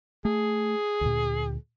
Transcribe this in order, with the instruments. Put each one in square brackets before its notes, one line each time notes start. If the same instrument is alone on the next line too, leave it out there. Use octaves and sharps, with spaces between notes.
[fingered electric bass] A3 [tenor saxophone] G#4
[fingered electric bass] D2 A#2